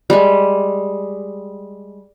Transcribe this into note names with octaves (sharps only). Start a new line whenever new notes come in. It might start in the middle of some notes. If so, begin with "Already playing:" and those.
G3 G#3